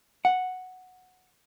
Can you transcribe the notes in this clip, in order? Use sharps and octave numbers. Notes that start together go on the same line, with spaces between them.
F#5